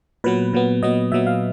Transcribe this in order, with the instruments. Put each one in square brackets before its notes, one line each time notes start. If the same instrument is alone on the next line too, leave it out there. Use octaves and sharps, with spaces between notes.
[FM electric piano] A#2 F#3 B3 B4
A#2 F#3 B3
A#2 F#3 B3 D#5
A#2 F#3 B3 E5
F5